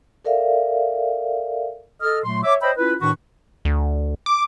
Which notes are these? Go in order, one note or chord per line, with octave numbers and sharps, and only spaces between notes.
A4 A#4 D5 E5 F5
A4 D#5 F6
A#2 F#3 A3 C6
C#5 E5 D6
C5 C#5 D#5 E5 G5 B5
C#4 E4 F4 B4
A2 D#3 D4 F#4 B4 C#6
D2
D6